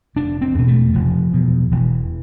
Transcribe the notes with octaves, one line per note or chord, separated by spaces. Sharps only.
F1 D4
C4
E2 B2
A3
F1 F3
E2 B2
E1 E3